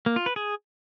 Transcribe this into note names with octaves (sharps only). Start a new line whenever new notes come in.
A#3
F4
B4
G#4